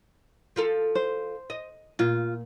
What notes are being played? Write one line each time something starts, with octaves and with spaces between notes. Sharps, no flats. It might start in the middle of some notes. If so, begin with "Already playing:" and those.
F3 F4 A4
C5
D#5
A#2 F4